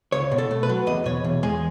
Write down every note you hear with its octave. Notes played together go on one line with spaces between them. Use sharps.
C#2 C#5
B2
A4
A3
B4
F#3
E2 D#5
B2 C#5
E2
G#3 G#4